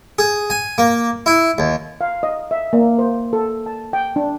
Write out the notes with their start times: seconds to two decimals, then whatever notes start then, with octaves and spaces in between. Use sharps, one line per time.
0.19 G#4
0.50 G#5
0.78 A#3
1.26 E4
1.58 D#2
2.01 F5
2.23 D#5
2.51 E5
2.73 A#3
2.99 C5
3.33 A4
3.66 A5
3.93 G5
4.16 D4